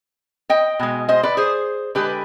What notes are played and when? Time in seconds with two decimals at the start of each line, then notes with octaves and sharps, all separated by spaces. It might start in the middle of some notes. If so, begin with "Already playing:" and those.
0.50 D#5 G5
0.79 B2 G#3
1.09 C5 D#5
1.23 B4 D5
1.37 G#4 C5
1.95 D3 G#3 G4 B4